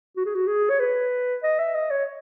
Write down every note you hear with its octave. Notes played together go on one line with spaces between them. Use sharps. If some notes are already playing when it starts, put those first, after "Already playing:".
F#4
G#4
F#4
G#4
C#5
B4
D#5
E5
D#5
C#5